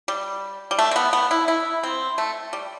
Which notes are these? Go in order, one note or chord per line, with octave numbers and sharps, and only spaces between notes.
G3
G3
A3
C4
B3
B3
E4
E4
C4
A3
G3